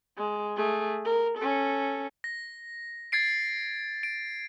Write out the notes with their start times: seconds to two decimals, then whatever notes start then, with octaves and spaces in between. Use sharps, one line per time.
0.18 G#3
0.56 A3 G#4
1.05 A#4
1.38 C#4 A4
2.24 A#6
3.12 G#6 A6 C7 D7
4.03 D7